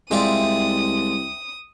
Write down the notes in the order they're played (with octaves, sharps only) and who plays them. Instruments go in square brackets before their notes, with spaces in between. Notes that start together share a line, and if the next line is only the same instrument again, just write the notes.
[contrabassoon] C2 [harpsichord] G#3 F4 D5 [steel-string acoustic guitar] E5 G5 [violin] D#6